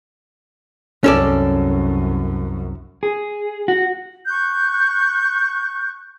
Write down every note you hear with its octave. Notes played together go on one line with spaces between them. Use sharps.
C2 F#2 C#4 A4 D5
G#4
F#4
C#6 F#6 G6